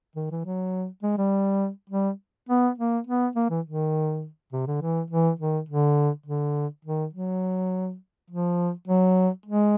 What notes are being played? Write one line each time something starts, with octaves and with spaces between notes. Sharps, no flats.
D#3
E3
F#3
G#3
G3
G3
B3
A#3
B3
A#3
E3
D#3
C3
D3
E3
E3
D#3
D3
D3
D#3
F#3
F3
F#3
G#3